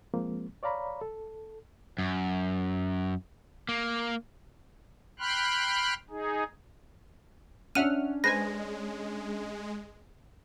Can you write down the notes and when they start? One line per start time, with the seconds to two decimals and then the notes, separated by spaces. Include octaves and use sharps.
0.14 F3 G#3 A#3 C4
0.63 C#5 D5 F5 A#5 B5
1.01 A4
1.98 F#2
3.69 A#3
5.19 G5 B5 C6 F6 F#6
6.10 D#4 G#4
7.75 C#4 D4 E5 F#5 F6 D#7
8.24 G#3 B4 C5 G#5 A#6